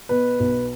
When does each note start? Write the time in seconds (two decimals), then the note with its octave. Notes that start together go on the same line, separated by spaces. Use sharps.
0.09 B2 B4
0.40 B1